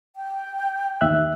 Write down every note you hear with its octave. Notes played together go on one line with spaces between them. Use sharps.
G5
D#2 E5 F#6